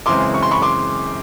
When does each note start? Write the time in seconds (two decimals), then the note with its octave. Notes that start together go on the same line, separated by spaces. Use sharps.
0.06 F#2 C#3 E3 G#3 C4 C6 D6
0.34 C#6
0.43 C6
0.51 B5 C#6
0.62 C6 D6